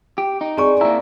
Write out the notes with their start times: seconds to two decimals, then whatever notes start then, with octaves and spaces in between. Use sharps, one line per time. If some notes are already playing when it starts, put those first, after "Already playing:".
0.18 G4
0.41 D#4
0.57 C4 G#4 D5 G#5 C#6
0.81 A#3 E4 A#5